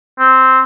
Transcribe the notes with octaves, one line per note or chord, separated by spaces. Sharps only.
C4